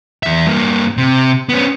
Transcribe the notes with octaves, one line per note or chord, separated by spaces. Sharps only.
E2 E5
G2 A#3
C3
B3 C#4